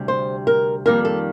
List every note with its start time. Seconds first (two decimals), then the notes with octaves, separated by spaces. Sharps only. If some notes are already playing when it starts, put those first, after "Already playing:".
Already playing: D2 C3 G3
0.08 C5
0.47 A#4
0.86 F2 D#3 G3 A#3 A#4
1.05 A4